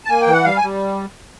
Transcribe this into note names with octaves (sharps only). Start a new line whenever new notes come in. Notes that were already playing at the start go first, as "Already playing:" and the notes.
A5
A#3 G#5
G5
E3
F#5
G3 F5
G#5
G3